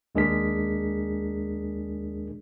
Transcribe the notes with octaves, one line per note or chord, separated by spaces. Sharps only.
D#2 G#3 D4 G#4 A#4 B6